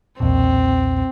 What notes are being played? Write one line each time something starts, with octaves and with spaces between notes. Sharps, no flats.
B1 E2 A#2 C4